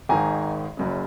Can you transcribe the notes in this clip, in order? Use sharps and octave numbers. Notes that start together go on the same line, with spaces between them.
G#1 G#2 D#3 G#5 A#5
F#1 F#2 C#3